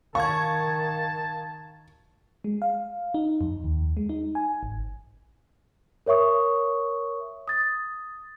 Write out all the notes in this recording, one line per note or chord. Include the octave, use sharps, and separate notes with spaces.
D#3 F5 A5 C#6 G#6
G#3
F5
D#4
F2
D#2
G#3
D#4
G#5
G#1
A#4 C#5 E5 C#6 D#6
D#6 A6